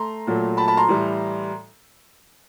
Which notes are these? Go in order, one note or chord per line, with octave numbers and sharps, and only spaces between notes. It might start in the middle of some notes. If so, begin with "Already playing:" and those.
Already playing: A3 A#5 C6
A#2 F#3 A3
A5 B5
A5 B5
A#5 C6
A2 E3 G3